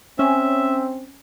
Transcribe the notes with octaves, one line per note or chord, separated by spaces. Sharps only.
C4 C#4 E5